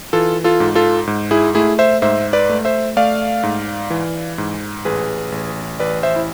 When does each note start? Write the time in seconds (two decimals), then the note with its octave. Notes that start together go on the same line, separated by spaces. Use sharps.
0.13 E3 F4 A4
0.44 F4 A4
0.60 G#2
0.75 F4 A4
1.07 G#2
1.31 E4 G#4
1.55 A3 E4 G#4
1.79 C5 E5
2.02 G#2 C5 E5
2.33 B4 D5
2.49 A3
2.65 C5 E5
2.97 A3 D5 F5
3.43 G#2
3.90 E3
4.38 G#2
4.85 A1 G#4 B4
5.32 A1
5.79 A1 B4 D5
6.03 C5 E5
6.16 E4